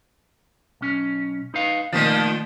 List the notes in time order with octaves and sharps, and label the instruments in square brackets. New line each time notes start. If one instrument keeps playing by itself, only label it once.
[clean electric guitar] B1 C#4
D#4 B4 F5
[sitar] A#2 D#3 F3 [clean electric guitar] A3 D5